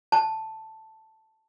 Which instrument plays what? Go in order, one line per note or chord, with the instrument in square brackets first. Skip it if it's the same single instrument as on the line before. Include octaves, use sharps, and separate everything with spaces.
[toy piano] A5